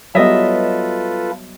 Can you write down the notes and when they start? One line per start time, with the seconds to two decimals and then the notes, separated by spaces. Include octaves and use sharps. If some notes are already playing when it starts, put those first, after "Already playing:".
0.15 F#3 G3 B3 F4 A4 B4 D#5 E5